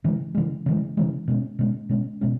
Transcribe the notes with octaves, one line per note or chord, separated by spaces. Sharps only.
C#3 E3 G#3
C#3 E3 G#3
C#3 E3 G#3
C#3 E3 G#3
B2 G#3 C#4
B2 G#3 C#4
B2 G#3 C#4
B2 G#3 C#4